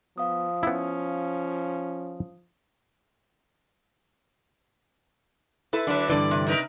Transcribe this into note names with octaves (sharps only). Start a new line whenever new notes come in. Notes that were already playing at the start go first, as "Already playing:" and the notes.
F3 B3 F5 D#6
B3 C#4 E4
E4 A4 B4
D3 F#3 D4 B4 E5
G2 D3 E3 D5
C3
D#4 A#4 B4